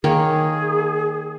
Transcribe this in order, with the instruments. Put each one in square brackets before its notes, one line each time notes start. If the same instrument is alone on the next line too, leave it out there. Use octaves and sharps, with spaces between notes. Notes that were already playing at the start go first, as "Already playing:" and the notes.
[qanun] D#3 A#3 C#5 [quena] G#4